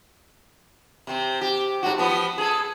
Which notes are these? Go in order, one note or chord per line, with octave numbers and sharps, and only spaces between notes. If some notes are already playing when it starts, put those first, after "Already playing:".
C3 C4
G4
G#2 F#4
F3 B3
G#4 A4